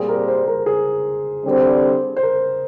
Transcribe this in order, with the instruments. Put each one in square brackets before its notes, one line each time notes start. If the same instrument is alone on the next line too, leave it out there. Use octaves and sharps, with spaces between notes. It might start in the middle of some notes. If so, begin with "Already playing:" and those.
Already playing: [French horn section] A#2 G3 C4 G4 [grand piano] G#4
[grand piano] A#4
C5
A#4
G#4
[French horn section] D3 G3 C4
[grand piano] C5
A#4